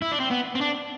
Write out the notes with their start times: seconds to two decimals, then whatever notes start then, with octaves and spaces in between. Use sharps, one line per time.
0.02 E4
0.11 D4
0.20 C4
0.30 B3
0.55 C4
0.61 D4